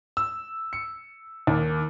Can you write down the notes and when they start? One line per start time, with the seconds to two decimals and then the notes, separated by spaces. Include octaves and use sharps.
0.17 E6
0.73 C#7
1.47 D#2